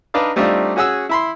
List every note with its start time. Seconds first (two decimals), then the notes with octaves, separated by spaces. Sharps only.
0.14 D4 D#4 B4 D5 F5
0.36 G3 A3 C4 D4 D#4 F4
0.76 C#4 F#4 G#4 F#5 E6
1.09 E4 B5 C6